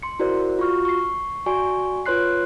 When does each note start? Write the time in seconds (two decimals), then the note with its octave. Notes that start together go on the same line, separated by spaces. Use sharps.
0.03 C6 C#7
0.19 E4 F#4 A#4 C5 D5
0.59 F4 F#4 C#6 F6
0.85 C#6 C7
1.46 F#4 D5 G#5 C#6
2.06 F4 B4 C#5 C6 F#6 C7